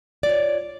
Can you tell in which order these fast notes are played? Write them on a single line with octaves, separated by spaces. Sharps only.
D5 F4 C#5